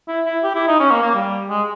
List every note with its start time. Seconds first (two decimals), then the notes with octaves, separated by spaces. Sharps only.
0.08 E4
0.26 E4
0.43 G4
0.55 E4
0.68 D#4
0.80 C#4
0.91 A#3
1.02 A#3
1.15 G3
1.49 G#3